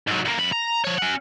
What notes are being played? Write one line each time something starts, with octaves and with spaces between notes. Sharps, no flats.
G#2 F#3
D2 A#3
F2 B5
A#5
F3 C#5
C#4 F#5